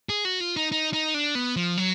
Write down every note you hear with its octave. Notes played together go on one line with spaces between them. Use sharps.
G#4
F#4
F4
D#4
D#4
D#4
D4
B3
F3
F#3